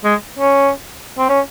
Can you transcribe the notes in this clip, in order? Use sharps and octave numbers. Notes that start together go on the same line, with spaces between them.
G#3
C#4
C4
C#4